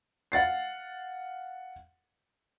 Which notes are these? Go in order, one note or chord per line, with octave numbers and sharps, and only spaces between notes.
F5 F#5 A6 C7